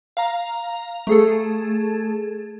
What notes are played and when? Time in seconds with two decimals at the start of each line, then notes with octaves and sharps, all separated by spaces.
0.17 F5 A#5
1.07 A3 G#4 A4